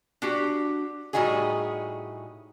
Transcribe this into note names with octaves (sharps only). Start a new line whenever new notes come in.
D4 F#4 G4
A2 C3 G3 D#4 F#4 G#4